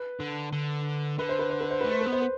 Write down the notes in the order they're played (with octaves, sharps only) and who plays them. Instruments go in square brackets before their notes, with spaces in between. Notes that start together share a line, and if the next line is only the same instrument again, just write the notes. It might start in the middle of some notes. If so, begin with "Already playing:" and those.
Already playing: [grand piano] B4
[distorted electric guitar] D3
D3
[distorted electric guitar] D3 [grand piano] B4
[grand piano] C5
B4
C5
B4
C5
[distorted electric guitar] A3 [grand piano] B4
[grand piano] C5
B4
[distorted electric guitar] B3
[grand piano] C5
B4